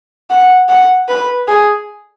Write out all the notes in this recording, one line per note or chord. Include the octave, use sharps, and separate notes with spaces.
F#5
F#5
B4
G#4